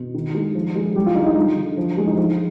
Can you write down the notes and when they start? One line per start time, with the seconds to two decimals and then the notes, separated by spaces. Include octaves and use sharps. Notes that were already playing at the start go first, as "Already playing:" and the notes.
Already playing: B2
0.14 D#3
0.34 G#3
0.55 F3
0.75 G#3
0.96 G3 G4
1.06 F4
1.16 D3 D#4
1.26 D#4
1.36 G3 F4
1.56 D3
1.77 F3
1.97 G#3
2.07 D#4
2.17 F3 F4